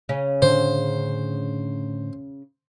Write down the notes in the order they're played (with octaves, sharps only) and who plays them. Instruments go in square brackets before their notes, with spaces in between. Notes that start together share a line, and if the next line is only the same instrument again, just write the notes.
[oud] C#3 C#4
[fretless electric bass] A2 D3 D4 [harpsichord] C5